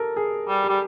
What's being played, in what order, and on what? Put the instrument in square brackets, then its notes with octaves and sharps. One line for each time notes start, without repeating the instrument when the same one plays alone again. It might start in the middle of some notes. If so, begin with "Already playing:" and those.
Already playing: [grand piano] G4 A4 A#4
G#4
[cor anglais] G3
[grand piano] G4
[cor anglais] G3